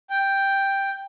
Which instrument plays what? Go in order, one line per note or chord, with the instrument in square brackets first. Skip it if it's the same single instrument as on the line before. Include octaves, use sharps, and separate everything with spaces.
[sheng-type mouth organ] G5